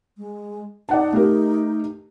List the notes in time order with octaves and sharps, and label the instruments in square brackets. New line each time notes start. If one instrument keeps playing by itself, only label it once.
[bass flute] G#3
[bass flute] D#4 [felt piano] D5 F#5 A5
[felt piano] A3 G4 A#4